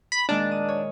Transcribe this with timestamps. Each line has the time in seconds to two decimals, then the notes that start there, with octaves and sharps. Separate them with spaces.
0.12 B5
0.29 A#2 D#3 G#3 D4
0.51 D#6
0.69 C#5